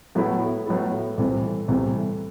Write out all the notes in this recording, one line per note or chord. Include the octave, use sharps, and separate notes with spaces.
A2 F#3 B3 E4 A4
A2 F#3 B3 E4 A4
C2 C3 E3 A3
C2 C3 E3 A3